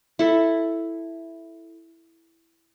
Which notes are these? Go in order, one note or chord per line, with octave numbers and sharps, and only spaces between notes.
E4 A4